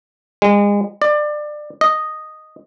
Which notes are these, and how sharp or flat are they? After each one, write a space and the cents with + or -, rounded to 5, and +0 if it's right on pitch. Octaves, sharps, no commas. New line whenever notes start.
G#3 -30
D5 +25
D#5 -5